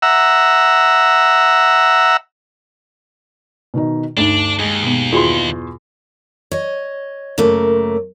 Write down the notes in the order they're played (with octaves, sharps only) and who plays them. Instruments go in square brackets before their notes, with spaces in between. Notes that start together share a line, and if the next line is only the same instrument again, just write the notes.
[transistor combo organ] E5 F#5 A#5 E6
[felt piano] B2 D#3 D#4
[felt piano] D2 E7 [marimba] G2 D#4 [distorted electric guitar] D4
[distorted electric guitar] D#2 [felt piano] G#3
[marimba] B2 B3
[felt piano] E2 C6 [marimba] F4 F#4 G#4
[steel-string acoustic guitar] C#5 D#5
F#2 C#3 A3 A#3